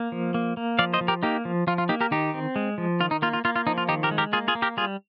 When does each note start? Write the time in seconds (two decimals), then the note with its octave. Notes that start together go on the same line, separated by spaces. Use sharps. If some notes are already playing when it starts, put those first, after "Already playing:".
Already playing: A#3
0.12 F3
0.34 A#3
0.57 A#3
0.79 F3 D5 F5
0.94 C5 D#5
1.01 F3
1.08 G4 A#4
1.23 A#3 D#4 G4
1.45 F3
1.67 F3 F4
1.78 F4
1.89 A#3 D#4 G4
2.01 G4 A#4
2.11 D#3 D#4 G4
2.34 C4
2.56 G#3
2.78 F3
3.00 D#3 F4
3.11 D#4
3.22 A#3 F4
3.33 F4
3.45 A#3 F4
3.56 F4
3.67 F3 D#4
3.78 F4
3.89 D#3 D#4 G4
4.03 G4 A#4
4.11 G#3
4.18 G4 A#4
4.33 A#3 F4 G#4
4.48 F4 G#4
4.55 A#3
4.62 G4 A#4
4.77 G3 F4 G#4